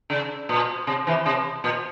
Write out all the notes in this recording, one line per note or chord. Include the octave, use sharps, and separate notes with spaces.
C#3
A#2
C3
C3 E3
C3
A#2